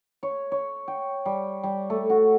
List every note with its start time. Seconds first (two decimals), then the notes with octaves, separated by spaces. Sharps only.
0.23 C#5
0.52 C#5
0.88 G5
1.25 G3
1.63 G3
1.90 A3
2.10 F#4